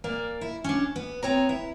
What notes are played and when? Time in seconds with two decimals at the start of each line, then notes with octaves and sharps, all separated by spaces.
0.04 A#2 A#3 D5
0.41 E4
0.64 C#4 D4
0.96 B3
1.23 B3 C4 C#5 A#5
1.49 E4